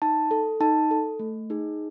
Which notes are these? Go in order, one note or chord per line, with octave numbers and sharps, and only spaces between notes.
D#4 A5
A4
D#4 A5
A4
A3
D#4 G#4